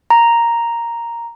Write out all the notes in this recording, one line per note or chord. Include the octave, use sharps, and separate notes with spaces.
A#5